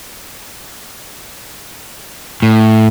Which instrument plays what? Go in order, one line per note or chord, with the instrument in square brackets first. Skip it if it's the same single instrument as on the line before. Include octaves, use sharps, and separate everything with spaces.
[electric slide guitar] A2